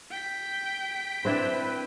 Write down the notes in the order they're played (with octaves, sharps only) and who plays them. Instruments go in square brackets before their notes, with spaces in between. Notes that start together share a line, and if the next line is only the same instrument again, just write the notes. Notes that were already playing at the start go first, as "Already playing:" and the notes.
[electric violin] G5 B6
[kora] C4 D4 E4 [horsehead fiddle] B4